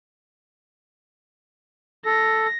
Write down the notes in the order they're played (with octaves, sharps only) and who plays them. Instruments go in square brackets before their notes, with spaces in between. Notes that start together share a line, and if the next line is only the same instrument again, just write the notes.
[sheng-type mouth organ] A4 [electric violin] A#6